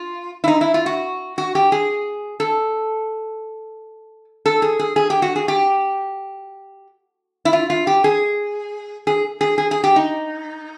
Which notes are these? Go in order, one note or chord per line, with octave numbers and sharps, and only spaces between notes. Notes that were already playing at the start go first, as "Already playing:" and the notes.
Already playing: F4
E4
D#4
E4
F4
F#4
F#4
G4
G#4
A4
A4
G#4
G#4
G#4
G4
F#4
G#4
G4
E4
F4
F4
G4
G#4
G#4
G#4
G#4
G#4
G4
D#4